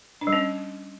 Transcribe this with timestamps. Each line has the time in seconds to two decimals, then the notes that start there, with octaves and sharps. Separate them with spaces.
0.21 D4
0.27 G3
0.33 C#4